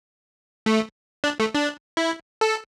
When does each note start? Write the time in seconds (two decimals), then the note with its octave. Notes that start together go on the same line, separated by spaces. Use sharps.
0.66 A3
1.24 D4
1.40 A3
1.54 D4
1.97 E4
2.41 A4